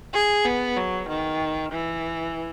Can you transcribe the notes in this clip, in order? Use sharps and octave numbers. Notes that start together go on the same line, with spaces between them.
G#4
B3
F#3
D#3
E3